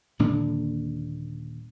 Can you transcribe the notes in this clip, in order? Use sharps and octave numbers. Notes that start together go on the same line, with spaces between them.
D#1 A#2 D3 D4